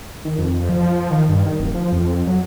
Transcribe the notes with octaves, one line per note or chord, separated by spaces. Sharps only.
D#3
F2
F3
D#3
G2
D#3
D1
F3
F2
F#3